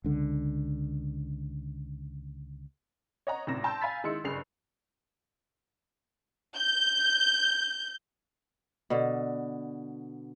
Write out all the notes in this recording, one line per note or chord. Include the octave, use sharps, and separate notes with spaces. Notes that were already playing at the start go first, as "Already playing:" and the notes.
C#2 D3
C#5 D#5 F#5 A#5
G#1 A2 C3 A#6 E7
G5 A5 A#5 C6 E6 G6
F5 G#5 A#5 B5 A6 B6
D#3 G#3 E4 C6 E6 C#7
F#1 G2 G#4 C7 F7
G6
B2 D3